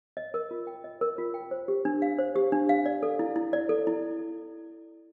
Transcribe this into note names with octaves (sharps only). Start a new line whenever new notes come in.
D#5
A#4
F4
G5
D#5
A#4
F4
G5
C5
G4
D4
F5
C5
G4
D4
F5
D5
A4
E4
E4
D5
A4
E4